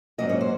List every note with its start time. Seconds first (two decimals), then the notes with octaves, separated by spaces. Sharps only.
0.18 G#2 D#3 F#3 A#3 C#4 D#5
0.29 C#5
0.41 C5